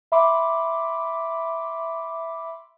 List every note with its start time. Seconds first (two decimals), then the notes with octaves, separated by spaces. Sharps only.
0.12 E5 B5 C6 D6